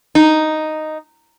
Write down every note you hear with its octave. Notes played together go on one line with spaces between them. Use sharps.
D#4